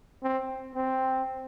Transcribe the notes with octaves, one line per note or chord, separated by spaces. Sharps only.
C4
C4